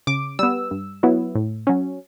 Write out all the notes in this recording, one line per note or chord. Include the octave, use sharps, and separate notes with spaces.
C#3 D6
G3 B3 E6
G2
F#3 B3 E4
A2
F#3 C#4